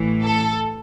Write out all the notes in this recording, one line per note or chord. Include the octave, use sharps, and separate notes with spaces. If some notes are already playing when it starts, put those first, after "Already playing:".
Already playing: A1 A2 E3
A4